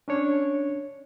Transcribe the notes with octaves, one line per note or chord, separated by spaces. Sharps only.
C#4 D4 C#5